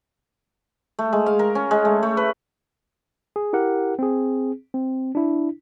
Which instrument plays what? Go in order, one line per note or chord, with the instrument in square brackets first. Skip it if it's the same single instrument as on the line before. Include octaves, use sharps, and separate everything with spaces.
[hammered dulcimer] A3
G#3
F5
A#4
C#4
G#3
A3
A3
B4
[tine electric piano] G#4
E4 G4 A#4 F#5
C4 G#4
C4
D4 E4